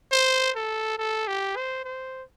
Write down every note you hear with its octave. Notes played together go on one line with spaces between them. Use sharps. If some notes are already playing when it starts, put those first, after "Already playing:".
C5
A4
A4
G4
C5
C5